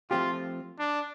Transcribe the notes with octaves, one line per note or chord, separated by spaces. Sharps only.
F3 A3 C4 F4 G4
D4